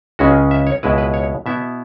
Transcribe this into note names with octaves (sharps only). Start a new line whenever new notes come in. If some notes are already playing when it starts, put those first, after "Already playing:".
C#2 C#3 G#3 C#4 F#4
E5
C#5
C#2 B2 G#3 E4 B4
B4
C#5
B2 B3 E4 E5